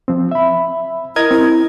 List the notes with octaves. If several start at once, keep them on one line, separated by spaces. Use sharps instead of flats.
F3 C4
E5 B5
E4 A#4 D#5 G#6
C4 E4